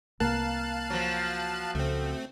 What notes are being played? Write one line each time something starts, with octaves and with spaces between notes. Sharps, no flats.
C2 A#3 F5 A5 F#6
F3 F#3
C#2 A3 C4